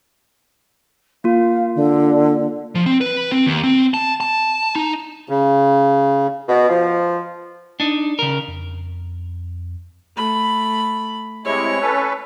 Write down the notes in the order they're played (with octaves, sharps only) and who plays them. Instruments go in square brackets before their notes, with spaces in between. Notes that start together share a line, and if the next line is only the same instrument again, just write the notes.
[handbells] A#3 F4 [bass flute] F5
[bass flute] D3
[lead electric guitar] F3
C4
B4
C4
D#2
C4
A5
A5
D#4
[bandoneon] C#3
[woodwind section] B2
F3
[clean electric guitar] D4 D#4
C#3 A#4
[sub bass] F2
[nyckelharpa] A3 B5
[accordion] C3 G#3 E4 [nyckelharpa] C#5
[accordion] C#4 A4 B4